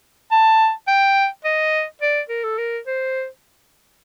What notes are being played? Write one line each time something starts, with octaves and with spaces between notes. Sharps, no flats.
A5
G5
D#5
D5
A#4
A4
A#4
C5